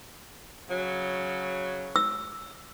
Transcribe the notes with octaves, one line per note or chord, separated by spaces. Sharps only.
C#3 F#3
E6